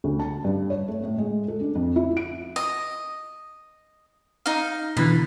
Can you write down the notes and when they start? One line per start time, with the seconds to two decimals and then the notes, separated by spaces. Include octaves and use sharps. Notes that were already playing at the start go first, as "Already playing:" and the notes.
0.04 D2
0.20 A5
0.44 G2
0.70 C#5
0.88 A3
1.04 A2
1.18 G#3
1.48 A4
1.60 D4
1.75 F2
1.96 E4
2.17 D7
2.56 D#5
4.46 D#4 F5
4.97 B2 D3 E3 B5